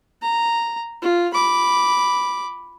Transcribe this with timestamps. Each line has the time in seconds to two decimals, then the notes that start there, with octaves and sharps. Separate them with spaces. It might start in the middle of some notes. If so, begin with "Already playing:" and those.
0.22 A#5
1.02 F4
1.34 B5 D6